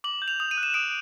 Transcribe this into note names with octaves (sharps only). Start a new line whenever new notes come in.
D6 F#7
G6
F7
D#6 F7
D#7
F#6
E7
D#6 D7